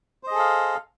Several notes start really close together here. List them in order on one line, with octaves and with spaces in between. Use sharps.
C5 D#5 G#4 A4 F5